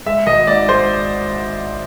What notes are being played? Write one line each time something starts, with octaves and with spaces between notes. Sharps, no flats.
G#3 E5
G#1 D#5
G#2 D5
G#3 C5